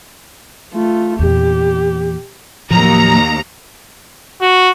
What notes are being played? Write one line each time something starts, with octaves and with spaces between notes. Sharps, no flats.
A3 F4
E2 A#2 G4
D#2 A2 F3 F#3 A#5
F#4